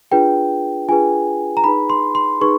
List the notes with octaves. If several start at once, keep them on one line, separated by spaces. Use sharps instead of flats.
D4 F4 G#4 B4 G5
D4 F4 G#4 B4 G#5
A#5
D#4 G#4 B4 B5
C6
C6
D#4 G#4 B4 C#6